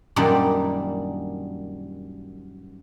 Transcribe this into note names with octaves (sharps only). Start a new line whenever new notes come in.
F#2 A#2 D#3 G3 D4